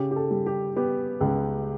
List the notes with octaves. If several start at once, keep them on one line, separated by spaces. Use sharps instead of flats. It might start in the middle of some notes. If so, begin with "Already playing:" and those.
Already playing: C#3 G4
G4
A4
G3
G4
B3 G4
C#2